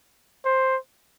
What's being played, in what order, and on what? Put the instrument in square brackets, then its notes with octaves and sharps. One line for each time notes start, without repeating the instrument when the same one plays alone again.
[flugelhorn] C5